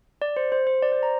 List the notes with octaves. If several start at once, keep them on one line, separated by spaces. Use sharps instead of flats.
D5
C5
C5
C5
D5
C5
A#5